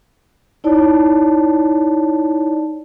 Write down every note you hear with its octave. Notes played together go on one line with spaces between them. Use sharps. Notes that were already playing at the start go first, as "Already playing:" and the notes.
D#4 E4 C#5 D5 A5